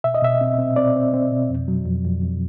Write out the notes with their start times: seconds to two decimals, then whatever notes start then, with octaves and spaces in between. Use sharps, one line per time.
0.04 B2 E5
0.14 D#5
0.22 B2 E5
0.41 C4
0.59 C4
0.76 C4 D5
0.96 C4
1.13 C4
1.31 B2
1.50 F2
1.68 F#3
1.86 F2
2.04 F2
2.22 F2